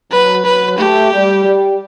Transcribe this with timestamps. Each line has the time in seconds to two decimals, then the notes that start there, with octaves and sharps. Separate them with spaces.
0.11 F#3 B4
0.45 F#3 B4
0.78 A3 G4
1.11 G3
1.44 G3